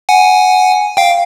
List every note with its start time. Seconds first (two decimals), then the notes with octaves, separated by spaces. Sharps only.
0.09 F#5 G#5
0.97 F5 G5